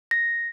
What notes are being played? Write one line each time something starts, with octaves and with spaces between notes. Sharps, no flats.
A#6